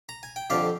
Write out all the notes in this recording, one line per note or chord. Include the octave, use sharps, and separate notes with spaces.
A#5
G#5
G5
F2 D3 G3 D5 F5